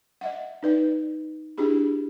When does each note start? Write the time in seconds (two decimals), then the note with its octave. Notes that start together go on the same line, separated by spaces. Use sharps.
0.21 D#5 E5 F#5
0.63 D#4 B4 D5
1.58 D4 E4 G4 G#4 B5